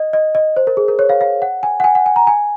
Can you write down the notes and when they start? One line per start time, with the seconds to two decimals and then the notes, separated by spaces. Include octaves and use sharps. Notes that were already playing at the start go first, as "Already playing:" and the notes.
Already playing: D#5
0.13 D#5
0.35 D#5
0.56 C5
0.67 A#4
0.77 G#4
0.88 A#4
0.99 C#5
1.09 F5
1.21 F5
1.42 F#5
1.63 G#5
1.80 F#5
1.84 G#5
1.95 F#5
2.06 G#5
2.16 A#5
2.27 G#5